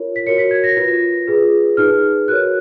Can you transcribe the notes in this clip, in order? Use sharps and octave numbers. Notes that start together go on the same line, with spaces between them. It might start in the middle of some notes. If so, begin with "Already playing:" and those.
Already playing: F4 A#4 C#5
B6
F#4 A#4 C#5 C#7
B6
G#6
A#6
F4 B4
F4 G#4 B4
D#4 G#4 B4 F6
F#4 A#4 C#5 F#6